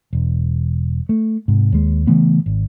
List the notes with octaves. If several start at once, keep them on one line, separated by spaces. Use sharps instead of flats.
E1
A3
G#2 C3
D#2 G#3
C#3 E3 A3 B3
G#1